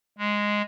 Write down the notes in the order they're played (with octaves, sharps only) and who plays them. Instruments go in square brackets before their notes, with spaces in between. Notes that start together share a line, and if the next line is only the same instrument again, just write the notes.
[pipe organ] G#3